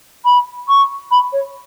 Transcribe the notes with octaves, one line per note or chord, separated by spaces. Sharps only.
B5
C#6
B5
C#5